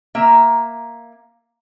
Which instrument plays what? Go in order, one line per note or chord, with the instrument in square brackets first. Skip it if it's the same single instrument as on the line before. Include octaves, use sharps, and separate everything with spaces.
[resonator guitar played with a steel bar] A#3 E5 A#5